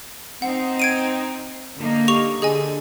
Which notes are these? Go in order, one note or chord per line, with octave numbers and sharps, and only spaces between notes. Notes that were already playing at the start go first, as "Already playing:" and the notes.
C4 D#4 F#5
G#6 D7 D#7
D3 A#3 D#4
G4 C#6 F7
D3 G#4 D#5 G#5